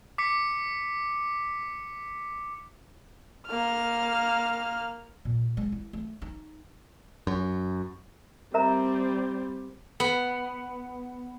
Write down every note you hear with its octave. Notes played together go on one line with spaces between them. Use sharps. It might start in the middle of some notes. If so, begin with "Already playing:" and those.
D6 B6 C#7
A#3 F6
A#2
G#3
E4
A3
D#4
F#2
G3 C4 A#4 E5 A#5
B3